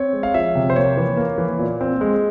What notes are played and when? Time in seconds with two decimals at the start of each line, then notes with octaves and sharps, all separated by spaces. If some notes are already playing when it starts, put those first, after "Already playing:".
Already playing: C4 C#5
0.13 G#3
0.23 F5
0.34 F3 E5
0.55 C3
0.70 C5
0.76 A#3 C#5
0.97 E3
1.17 A#3
1.38 E3
1.59 A#2
1.81 C4
2.01 G#3